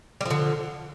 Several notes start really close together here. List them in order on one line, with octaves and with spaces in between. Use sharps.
G3 F3 D3